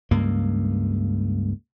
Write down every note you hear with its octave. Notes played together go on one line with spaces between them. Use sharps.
C#2 G2 A#3